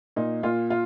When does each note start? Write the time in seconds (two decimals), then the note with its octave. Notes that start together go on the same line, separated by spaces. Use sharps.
0.16 A#2 D#4
0.43 A#2 F4
0.70 F4